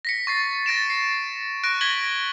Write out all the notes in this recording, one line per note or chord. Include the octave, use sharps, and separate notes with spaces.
A#6 B6 C#7
C#6 A6 C7
A6 A#6 D7 E7
C7
C#6 F#6 A#6 D7
G#6 A#6 B6 F#7 G7